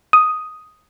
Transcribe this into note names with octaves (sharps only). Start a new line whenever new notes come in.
D#6